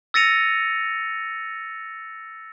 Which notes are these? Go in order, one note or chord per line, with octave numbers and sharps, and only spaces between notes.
E6 A6 A#6 C#7 D#7 F7